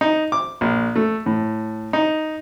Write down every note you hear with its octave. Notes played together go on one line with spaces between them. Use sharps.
D#4
D6
A#1
A3
A2
D#4